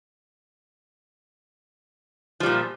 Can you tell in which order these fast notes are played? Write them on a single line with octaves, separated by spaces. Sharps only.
F3 G3 A#2